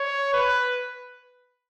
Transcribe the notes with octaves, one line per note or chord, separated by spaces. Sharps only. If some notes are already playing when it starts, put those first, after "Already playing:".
Already playing: C#5
B4